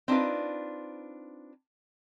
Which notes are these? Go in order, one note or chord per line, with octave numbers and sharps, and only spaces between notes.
C4 D4 D#4 F4 B4